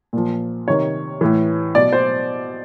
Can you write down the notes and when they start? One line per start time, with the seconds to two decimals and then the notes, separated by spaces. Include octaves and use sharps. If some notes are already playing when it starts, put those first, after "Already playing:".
0.13 A#2 F3
0.68 C3 D#3 C#5
1.21 A2 E3
1.75 B2 D5
1.93 C5